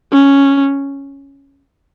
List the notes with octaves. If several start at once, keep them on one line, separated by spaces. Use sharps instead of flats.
C#4